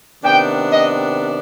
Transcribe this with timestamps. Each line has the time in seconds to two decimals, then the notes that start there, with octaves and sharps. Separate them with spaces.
0.24 C3 D#3 B3 D4 G5
0.71 D#5